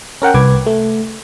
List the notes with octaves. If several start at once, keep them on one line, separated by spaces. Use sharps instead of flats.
C#4 A#4 F#5 G5
C2 B4 D6 G#6
A3